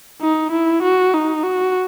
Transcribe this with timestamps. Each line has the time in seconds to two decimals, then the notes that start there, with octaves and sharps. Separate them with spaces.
0.22 D#4
0.52 E4
0.83 F#4
1.14 D#4
1.44 F#4